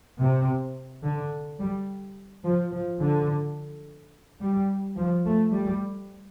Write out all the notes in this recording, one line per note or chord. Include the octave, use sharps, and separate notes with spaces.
C3
D3
G3
F3
F3
D3
G3
F3
A3
G3